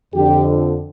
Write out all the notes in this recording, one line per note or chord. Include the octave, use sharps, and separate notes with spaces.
F2 D3 G4